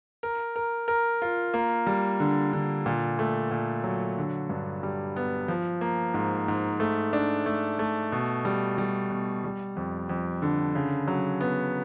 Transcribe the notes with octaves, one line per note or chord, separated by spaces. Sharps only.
A#4
A#4
A#4
F4
A#3
G3
D3
D3
A#2
A3
A#2
F#3
D3
G2
G3
B3
F3
A#3
G#2
G#2
A3
D4
A3
A3
B2
G3
G3
B2
G3
F2
F2
D3
C#3
F#3
B3